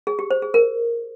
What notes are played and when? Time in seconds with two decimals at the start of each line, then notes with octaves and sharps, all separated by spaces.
0.07 G#4
0.19 G4
0.30 C5
0.42 G#4
0.54 A#4